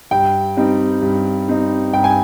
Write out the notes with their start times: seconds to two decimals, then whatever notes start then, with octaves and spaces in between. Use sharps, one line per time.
0.11 G2 G5
0.57 G3 C4 D#4
1.02 G2
1.48 G3 C4 D#4
1.93 G2 G5
2.04 G#5